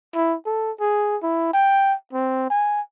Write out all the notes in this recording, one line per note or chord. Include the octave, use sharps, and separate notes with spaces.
E4
A4
G#4
E4
G5
C4
G#5